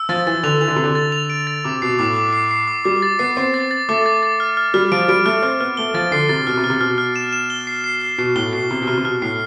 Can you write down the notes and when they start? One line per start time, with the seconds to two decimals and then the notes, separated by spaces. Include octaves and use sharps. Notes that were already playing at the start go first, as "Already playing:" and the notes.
Already playing: E6
0.09 F3 A6
0.27 E3 A6
0.43 D3 F7
0.61 E3 F7
0.68 D3
0.76 C3 F7
0.84 D3
0.95 A6
1.12 F7
1.30 D7
1.47 A6
1.64 C3 D6
1.82 B2 C7
1.99 A2 D6
2.16 D6
2.33 C7
2.51 C7
2.67 D6
2.85 G3 D6
3.02 A6
3.19 B3 C7
3.36 C4 C7
3.54 A6
3.71 A6
3.89 A3 D6
4.06 A6
4.23 A6
4.40 F6
4.57 F6
4.74 G3 F6
4.92 F3 D7
5.08 G3 D7
5.25 A3 F6
5.43 C4 F6
5.60 B3 F6
5.77 A3 G7
5.94 F3 A6
6.12 D3 C7
6.29 C3 A6
6.47 B2 F6
6.57 C3
6.64 F6
6.70 C3
6.81 B2 F6
6.98 F6
7.16 E7
7.33 E7
7.50 G7
7.67 C7
7.84 C7
8.01 C7
8.18 B2 C7
8.36 A2 G7
8.53 B2 C7
8.70 C3 C7
8.82 B2
8.87 C3 F6
8.98 C3
9.05 B2 F6
9.22 A2 C7